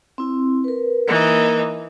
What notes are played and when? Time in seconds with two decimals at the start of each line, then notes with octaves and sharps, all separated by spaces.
0.18 C4 E4
0.64 A#4 B4
1.08 E3 A#3 D#4 A#4